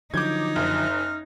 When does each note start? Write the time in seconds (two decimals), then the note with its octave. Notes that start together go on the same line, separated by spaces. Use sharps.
0.14 D3 F3 F#3 D#4 D6 G6 G#6
0.56 F#1 F6